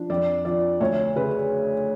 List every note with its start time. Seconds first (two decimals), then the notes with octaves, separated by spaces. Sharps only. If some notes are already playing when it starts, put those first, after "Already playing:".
Already playing: F3 D4
0.10 F2 D5
0.45 F3 D5
0.80 D2 C#5
1.16 C#3 B4